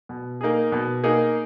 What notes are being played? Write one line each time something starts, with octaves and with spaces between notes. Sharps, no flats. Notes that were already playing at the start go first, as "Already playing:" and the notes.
B2
A#3 D#4 G#4
B2
A#3 D#4 G#4